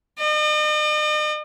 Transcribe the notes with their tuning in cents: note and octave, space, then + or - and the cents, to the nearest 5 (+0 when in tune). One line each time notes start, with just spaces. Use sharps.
D#5 -45